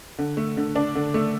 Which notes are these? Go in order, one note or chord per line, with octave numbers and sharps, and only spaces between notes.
D3
A3
D3
D4
D3
A3